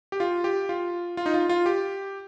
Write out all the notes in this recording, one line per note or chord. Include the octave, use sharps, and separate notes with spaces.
G4
F4
G4
F4
F4
D#4
F4
F4
G4